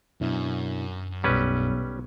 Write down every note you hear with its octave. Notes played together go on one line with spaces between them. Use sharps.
F#2 B2 D4 E4
B1 B2 G3 C#4 B4 E6